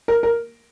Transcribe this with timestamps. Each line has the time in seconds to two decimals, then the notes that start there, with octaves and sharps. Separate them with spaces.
0.08 A#4
0.23 A#4